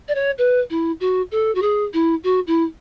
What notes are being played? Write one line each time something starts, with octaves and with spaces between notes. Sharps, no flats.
D5
C#5
B4
E4
F#4
A4
F#4
G#4
E4
F#4
E4